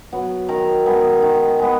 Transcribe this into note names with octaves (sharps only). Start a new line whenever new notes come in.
F#3 B3
D#3 A#4
G#3 B3
D#3
G#3 B3